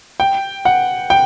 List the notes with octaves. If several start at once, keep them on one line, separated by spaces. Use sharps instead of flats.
G5
F#5
G5